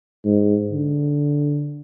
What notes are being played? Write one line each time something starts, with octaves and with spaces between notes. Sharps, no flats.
G#2
D3